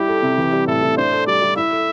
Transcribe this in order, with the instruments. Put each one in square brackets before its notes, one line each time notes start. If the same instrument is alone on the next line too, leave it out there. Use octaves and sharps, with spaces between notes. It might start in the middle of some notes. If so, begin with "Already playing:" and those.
Already playing: [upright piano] G3 E4 [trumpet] G4
[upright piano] A4
C3
E3
G3
[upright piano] A2 [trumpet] A4
[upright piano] A2
[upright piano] D4 [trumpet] C5
[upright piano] A4
[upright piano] G3 [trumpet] D5
[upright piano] G3
[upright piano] E4 [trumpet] E5
[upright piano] A4